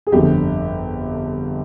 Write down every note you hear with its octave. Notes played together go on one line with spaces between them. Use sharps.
G#4
G1 F2 D3 G4